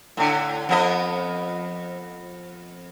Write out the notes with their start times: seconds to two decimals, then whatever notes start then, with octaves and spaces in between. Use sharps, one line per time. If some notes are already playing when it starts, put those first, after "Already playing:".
0.17 A2 D3
0.69 F2 B3 D#5